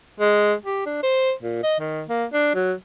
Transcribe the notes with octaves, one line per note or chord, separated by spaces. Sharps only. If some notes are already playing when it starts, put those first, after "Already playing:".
G#3
G4
D4
C5
A#2
D#5
D#3
A#3
D4
F#3